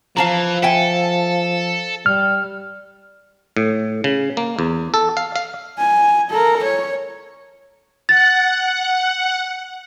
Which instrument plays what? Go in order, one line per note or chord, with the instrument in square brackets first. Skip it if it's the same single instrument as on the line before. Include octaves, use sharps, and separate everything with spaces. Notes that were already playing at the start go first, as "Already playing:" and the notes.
[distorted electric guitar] E3 [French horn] F3 [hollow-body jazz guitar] F5 A5 A#5
[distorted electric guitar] A4 [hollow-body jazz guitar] E5 G5 G#5
[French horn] G3 [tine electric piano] F6
[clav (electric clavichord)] A2
C#3
A#3
E2
A4
F5
F5
[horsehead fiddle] G#5
A4 A#4
C#5
[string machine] F#5 [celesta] A6